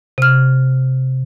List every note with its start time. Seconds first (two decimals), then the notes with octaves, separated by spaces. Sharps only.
0.18 C3 F6